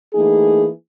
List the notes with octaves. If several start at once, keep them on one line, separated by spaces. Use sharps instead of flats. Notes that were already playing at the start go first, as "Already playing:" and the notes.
E3 A3 A#3 D#4 G#4